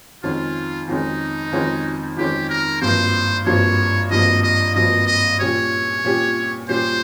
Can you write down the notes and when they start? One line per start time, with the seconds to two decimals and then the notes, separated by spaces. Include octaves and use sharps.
0.23 F2 D#3 G#3 C#4 F4
0.88 F2 D#3 G#3 C#4 D#4
1.52 F2 D#3 G#3 C#4
2.17 F2 D#3 G#3 C#4 G4
2.49 A#4
2.82 G#1 G2 F3 A#3 C5
3.46 G#1 G2 F3 A#3 C#5
4.11 G#1 G2 F3 A#3 D#5
4.43 D#5
4.75 G#1 G2 F3 A#3 D#5
5.07 D#5
5.40 A#2 G3 C#4 G4 C#5
6.04 A#2 G3 C#4 G4
6.69 A#2 G3 C#4 G4 C5